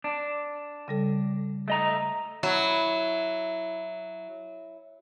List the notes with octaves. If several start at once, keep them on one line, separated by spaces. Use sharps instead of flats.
D4
C#3 G3 A4
A3 D#5 A#5
F#3 E4